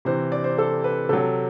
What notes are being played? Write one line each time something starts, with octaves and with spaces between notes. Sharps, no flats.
C3 E3 C5
D5
C5
A4
B4
C3 F#3 A4